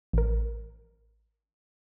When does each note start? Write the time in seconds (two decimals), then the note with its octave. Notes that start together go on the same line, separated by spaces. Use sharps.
0.13 A1 A#4